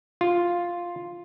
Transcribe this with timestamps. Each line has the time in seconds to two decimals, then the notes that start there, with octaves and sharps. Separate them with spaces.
0.21 F4